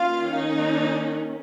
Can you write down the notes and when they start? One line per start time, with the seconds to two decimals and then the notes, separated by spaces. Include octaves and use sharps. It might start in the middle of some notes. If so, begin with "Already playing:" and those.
Already playing: D#3 A#3 C#4 F4 F5
0.34 D#4